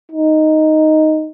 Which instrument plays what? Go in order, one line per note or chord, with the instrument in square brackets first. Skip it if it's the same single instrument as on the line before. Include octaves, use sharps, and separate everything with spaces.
[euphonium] D#4